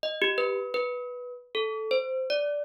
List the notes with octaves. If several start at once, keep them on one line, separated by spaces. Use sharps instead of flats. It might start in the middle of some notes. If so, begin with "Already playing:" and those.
D#5
G4
B4
B4
A4
C5
D5